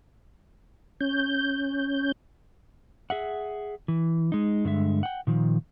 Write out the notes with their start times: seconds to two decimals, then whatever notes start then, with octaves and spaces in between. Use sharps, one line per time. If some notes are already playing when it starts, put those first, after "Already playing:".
1.01 C#4 G6
3.10 G#4 E5 F#5
3.88 E3
4.32 G#3 D#4
4.65 G2 D3 G#3 E5
5.03 F#5 G5
5.27 A#2 D#3 F3